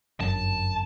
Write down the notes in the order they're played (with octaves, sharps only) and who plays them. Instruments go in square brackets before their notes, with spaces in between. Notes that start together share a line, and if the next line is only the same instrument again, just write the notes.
[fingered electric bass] G1 F#2 [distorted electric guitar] A5